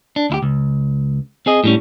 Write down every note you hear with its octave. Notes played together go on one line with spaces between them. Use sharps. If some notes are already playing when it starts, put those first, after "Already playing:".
D4
D2 E4 G4
C#2
C4 G#4 D#5
A2 G3 C#4